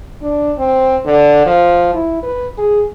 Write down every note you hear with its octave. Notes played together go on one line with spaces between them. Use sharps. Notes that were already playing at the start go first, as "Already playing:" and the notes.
D4
C4
D3
F3
E4
B4
G#4